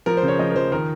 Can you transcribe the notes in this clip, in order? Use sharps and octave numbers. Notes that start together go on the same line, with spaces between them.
F3 A#4
C5
C#3
C#5
F3 D#5
A#4
F3 C5
D#3 A#4